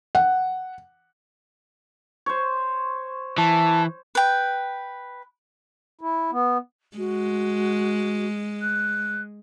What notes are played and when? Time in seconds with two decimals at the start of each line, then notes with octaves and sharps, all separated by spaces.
0.15 F#5
2.26 C5 C#5
3.38 E3 A5
4.15 B4 G5
6.01 E4
6.32 B3
6.97 G#3 F#4
8.61 F#6